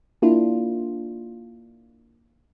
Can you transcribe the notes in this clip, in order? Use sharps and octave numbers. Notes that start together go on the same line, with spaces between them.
A#3 D4 E4 F4